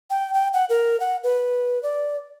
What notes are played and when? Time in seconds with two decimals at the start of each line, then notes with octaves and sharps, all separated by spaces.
0.10 G5
0.34 G5
0.54 F#5
0.69 A#4
1.00 F#5
1.24 B4
1.83 D5